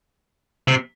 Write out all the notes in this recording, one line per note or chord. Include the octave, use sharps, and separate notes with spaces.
C3